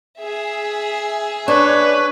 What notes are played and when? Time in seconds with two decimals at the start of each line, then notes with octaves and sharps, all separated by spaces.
0.21 G#4 E5
1.48 D4 B4 C#5